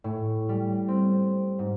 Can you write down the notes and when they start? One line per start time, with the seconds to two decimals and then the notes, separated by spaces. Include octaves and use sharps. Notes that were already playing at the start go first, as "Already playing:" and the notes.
0.04 A2
0.49 G3
0.88 C4
1.59 G#2